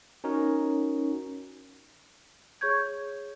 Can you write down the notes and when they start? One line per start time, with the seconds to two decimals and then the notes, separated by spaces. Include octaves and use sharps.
0.24 C#4 D#4 F#4 A#4 C#5
2.61 G#4 C#5 C#6 G6 G#6